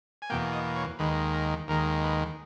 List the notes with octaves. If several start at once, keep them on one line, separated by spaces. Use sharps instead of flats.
G#5
E2 B2 A#3 G5
D#5
C#5
D#2 D#3 G#3 B4
A#4
D#2 D#3 G#3 A#4
B4